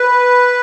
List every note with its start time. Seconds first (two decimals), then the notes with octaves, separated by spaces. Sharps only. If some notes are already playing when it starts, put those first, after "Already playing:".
Already playing: B4